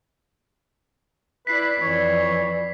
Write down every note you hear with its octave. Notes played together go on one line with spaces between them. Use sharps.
E4 B4 D5 B6 C7
F2 E3 C#5 D5